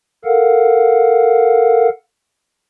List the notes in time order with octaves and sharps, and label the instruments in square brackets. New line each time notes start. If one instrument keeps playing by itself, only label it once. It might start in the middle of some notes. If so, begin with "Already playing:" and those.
[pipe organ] A4 A#4 F5 F#5